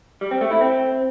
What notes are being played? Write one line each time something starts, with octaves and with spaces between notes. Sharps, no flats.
G3
C4
A3
E4
C4